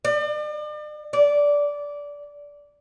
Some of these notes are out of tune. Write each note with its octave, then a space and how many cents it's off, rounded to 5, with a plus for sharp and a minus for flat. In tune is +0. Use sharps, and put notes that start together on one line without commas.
D5 +40
D5 -15